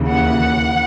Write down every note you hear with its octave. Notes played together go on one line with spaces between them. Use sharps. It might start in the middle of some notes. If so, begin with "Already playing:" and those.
Already playing: D#2 C#3 E3
F#5